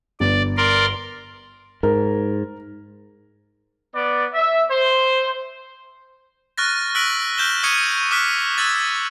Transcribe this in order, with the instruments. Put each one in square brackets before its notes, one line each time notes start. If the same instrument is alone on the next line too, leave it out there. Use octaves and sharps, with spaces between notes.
[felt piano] G1 [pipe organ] D5
[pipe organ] A#4 D5 C6
[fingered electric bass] G#2 [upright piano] A#4
[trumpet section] B3 D5
E5
C5
[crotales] C#6 F6 F#6 A6 A#6
E6 F#6 A#6 B6 D7 F#7
F6 G6 E7 G7
C#6 D#6 F6 G#6 C#7 D#7
D6 D#6 F6 F#6 B6
E6 F#6 G#6 A6